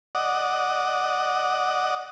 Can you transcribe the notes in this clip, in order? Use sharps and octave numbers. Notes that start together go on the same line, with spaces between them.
D5 D#5 F#5